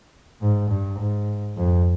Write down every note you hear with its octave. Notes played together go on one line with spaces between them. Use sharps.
G#2
G2
G#2
F2